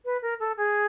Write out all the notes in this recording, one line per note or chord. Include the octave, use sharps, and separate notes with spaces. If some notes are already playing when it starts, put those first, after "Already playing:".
B4
A#4
A4
G#4